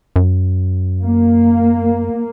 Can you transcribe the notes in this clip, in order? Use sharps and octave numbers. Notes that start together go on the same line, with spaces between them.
F#2
A#3